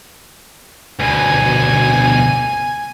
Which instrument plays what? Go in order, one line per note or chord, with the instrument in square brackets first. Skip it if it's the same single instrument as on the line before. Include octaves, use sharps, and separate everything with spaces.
[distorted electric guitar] D2 B2 [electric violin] G#5